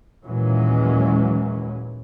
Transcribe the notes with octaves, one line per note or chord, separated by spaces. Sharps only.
D#2 A#2 E3 F#3 G#3 C#4